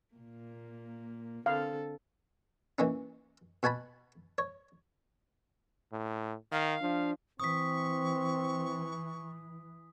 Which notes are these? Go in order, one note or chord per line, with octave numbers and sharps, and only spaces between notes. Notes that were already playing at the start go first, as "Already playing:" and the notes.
A#2 A#3
D3 C4 A4 F5
E3 A#3 C#4 D#4
B2 F#4 G#5 A5 B5
C#5
A2
D#3 F5
F3 D4
E3 C4 C#6 D#6 B6